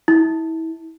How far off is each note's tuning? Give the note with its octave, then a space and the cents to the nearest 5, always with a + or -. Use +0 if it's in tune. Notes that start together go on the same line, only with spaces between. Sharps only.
E4 -30